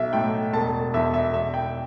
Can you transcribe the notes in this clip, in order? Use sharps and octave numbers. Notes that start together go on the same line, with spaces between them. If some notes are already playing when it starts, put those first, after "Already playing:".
Already playing: B1 E5
A2 A3 G5
E1 A5
E2 E3 E5
E5
E1 E5
G5